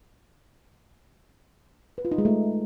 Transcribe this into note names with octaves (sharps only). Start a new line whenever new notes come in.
B4
F4
D#4
G#3
A3